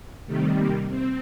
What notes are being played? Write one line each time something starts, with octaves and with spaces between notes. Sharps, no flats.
C3 D#3 G3 A3
A#3
C4